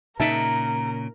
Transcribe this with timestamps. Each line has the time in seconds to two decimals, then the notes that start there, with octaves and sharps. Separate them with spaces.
0.20 A#2 C#3 D#4 A#4 E5 A5